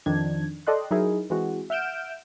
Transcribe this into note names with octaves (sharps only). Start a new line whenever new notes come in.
F2 D#3 D4 G#6
A4 D5 D#5 G5 C6 F#6
F#3 D#4 E4 G#4 A#4
E3 G#3 C4 F#4
E5 F#5 F6 G6 D7 E7